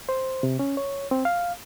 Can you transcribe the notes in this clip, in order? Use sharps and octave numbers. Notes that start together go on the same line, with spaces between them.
C5
C3
C#4
C#5
C4
F5